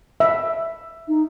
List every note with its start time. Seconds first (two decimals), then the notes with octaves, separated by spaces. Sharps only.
0.20 E5
1.08 D#4